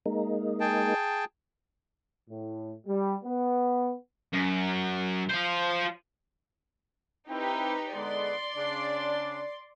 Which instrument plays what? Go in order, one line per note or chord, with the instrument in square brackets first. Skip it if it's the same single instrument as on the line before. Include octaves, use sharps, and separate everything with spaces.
[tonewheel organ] G#3 A#3 D#4
[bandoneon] G#4 G5 A5
[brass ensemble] A2
G3
B3
[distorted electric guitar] F#2
F4 C5
[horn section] C4 E4 G5 [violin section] D#4 G4 B4
[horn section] D3 G#3 B3 [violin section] D5 C6
[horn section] C#3 D4